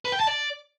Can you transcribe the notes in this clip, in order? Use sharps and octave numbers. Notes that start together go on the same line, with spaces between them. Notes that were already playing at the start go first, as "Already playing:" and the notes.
B4
G5
A5
D5